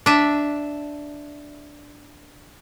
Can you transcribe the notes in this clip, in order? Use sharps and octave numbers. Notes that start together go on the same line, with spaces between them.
D4 E5